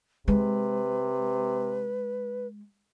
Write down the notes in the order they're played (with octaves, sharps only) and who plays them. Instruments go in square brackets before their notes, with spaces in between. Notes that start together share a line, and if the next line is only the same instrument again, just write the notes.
[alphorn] C3 [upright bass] G#3 [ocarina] B4